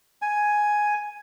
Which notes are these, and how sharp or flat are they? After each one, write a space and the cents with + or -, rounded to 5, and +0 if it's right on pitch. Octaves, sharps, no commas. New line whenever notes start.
G#5 +5